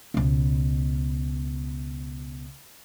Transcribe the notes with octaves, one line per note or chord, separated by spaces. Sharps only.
C#2 B2